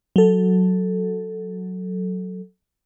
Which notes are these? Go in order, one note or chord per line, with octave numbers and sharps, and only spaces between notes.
F#3 A4